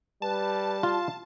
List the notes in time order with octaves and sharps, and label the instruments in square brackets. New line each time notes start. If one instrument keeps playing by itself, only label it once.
[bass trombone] G3 [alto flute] B4 [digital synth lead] A5
[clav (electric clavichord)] F4 [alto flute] F5